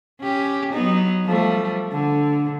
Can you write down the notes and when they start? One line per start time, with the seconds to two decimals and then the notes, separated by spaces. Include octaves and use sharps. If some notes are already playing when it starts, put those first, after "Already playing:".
0.21 C#4 G4
0.72 F#3 B3 D#4
1.24 F3 G3 A3
1.92 D3